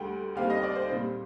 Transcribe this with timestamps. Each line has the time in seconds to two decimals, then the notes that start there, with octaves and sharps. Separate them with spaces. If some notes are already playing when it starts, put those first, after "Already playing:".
Already playing: D2 D3 G3 G5
0.36 D#2 D3 G3 C4 F5
0.50 D#5
0.63 D5
0.75 C5
0.89 A#2 G3 C4